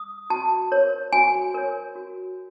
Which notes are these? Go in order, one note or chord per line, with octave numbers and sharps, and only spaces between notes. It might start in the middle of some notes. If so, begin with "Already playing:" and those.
Already playing: D#6
F#4 A5
A#4 C#5
F#4 G#5
A#4 C#5
F#4